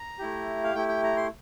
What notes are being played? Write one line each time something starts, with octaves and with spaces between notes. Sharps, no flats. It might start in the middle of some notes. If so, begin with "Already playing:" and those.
Already playing: A#5
A3 E4 G4
F5
A3 E4 G4 G5
G5
A#5
C6